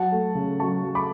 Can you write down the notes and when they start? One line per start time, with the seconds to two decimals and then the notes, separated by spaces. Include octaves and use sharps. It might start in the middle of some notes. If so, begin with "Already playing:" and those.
Already playing: F#3 F#5 A5
0.12 A3
0.35 C#3
0.60 F#3 A5 C#6
0.84 F#3
0.95 B5 D6